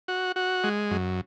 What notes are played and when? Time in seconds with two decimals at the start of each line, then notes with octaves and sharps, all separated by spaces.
0.08 F#4
0.36 F#4
0.64 G#3
0.91 F#2